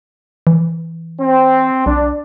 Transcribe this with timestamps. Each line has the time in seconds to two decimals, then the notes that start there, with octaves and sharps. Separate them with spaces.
0.47 E3
1.19 C4
1.86 B1 D4